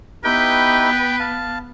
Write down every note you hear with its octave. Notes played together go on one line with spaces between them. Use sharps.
B3 D#4 E4 G4 B4 G5
F5 A5